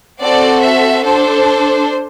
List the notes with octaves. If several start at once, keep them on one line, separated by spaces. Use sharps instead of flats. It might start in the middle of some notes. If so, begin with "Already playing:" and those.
C4 F#4 A4 D5
E5
D4 A4 C5